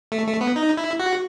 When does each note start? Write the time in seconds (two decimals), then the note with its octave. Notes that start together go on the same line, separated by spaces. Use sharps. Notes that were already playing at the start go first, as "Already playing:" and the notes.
0.12 A3
0.27 A3
0.41 B3
0.56 D#4
0.77 E4
1.00 F#4